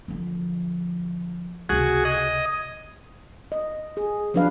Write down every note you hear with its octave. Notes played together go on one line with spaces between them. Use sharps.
D3 F3
C#2 C3 F#4 G#4 G#6
D#5
D#5
G#4
F3 F#3 D4 B4 F5